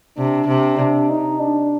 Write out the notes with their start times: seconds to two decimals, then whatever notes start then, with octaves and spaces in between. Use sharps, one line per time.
0.18 C3 D4
0.48 C3
0.79 D4
1.09 D#4
1.40 D4